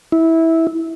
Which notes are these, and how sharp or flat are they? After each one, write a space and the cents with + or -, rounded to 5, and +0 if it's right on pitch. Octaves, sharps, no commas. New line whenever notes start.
E4 -15